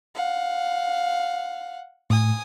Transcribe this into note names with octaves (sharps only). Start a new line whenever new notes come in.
F5 F#5
A2 G#5 D#6